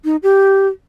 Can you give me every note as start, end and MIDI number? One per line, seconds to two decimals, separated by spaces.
0.05 0.16 63
0.23 0.68 67